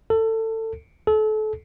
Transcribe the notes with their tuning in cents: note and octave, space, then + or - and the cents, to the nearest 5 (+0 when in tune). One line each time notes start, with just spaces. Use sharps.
A4 +25
A4 -30